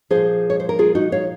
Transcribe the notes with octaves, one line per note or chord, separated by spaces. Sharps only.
A#2 F3 G#4 C5
C#5
C5
A#4
F4 G#4
D#4 F#4
C#5 F5